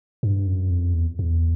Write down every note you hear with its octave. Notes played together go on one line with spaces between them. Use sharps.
G2
F#2
F2
E2
E2